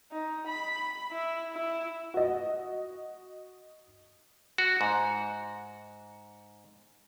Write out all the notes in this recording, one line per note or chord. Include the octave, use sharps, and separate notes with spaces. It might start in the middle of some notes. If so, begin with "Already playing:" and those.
D#4
B5
E4
E4
F#4 D#5
F#4
G#2